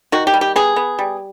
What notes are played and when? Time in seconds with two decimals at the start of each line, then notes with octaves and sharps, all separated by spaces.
0.12 D#3 F#4
0.27 G4
0.34 G3
0.41 G4
0.56 B3 G#4
0.76 B3
0.99 G3